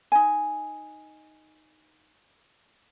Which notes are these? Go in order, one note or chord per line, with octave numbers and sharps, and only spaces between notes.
D#4 G#5